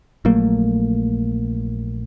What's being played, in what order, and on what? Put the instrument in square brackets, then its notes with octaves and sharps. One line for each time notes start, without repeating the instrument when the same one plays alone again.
[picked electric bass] A#1 F#3 A3 A#3